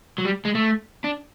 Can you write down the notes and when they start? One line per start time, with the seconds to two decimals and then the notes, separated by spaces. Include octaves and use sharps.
0.18 F#3
0.25 G3
0.45 G#3
0.55 A3
1.04 D4